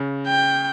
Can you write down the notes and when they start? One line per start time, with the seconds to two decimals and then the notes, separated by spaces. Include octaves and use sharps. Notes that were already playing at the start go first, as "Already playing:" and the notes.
Already playing: C#3
0.27 G5